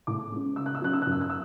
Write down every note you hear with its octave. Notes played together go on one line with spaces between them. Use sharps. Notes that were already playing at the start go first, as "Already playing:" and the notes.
A2 D6
G#3 C#4
C#3 E6
F#6
E6
F#3 C#4 F#6
E6
F#6
F#2
E6
F#6
E6